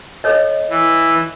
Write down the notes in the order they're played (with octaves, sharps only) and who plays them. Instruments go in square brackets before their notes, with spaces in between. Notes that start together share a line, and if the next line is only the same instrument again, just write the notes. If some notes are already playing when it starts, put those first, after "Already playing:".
[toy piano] A4 C#5 D#5
[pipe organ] E3